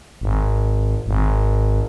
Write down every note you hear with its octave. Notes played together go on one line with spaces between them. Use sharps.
G#1
G#1